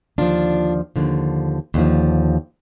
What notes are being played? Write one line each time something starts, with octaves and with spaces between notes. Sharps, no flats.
D#2 D3 F3 D4 F4
D#2 D3 F3
D#2 D3 F3